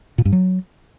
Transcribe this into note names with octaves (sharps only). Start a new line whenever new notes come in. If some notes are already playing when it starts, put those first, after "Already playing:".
A#2
G2
F#3